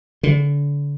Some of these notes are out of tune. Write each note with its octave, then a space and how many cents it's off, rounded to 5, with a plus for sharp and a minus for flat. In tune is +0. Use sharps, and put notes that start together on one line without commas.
D3 -35